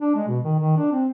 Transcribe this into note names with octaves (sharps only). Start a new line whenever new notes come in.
D4
G#3
B2
D#3
D#3
D4
C4